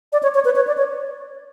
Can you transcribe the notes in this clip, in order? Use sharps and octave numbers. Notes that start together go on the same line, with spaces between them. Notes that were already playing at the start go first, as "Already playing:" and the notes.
D5
C#5
C#5
B4
C#5
D5
C#5